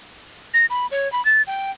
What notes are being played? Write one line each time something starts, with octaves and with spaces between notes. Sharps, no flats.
A#6
B5
C#5
B5
A6
G5